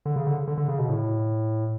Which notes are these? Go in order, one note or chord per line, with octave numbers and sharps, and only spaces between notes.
D3
C#3
D3
D3
D3
C#3
B2
A2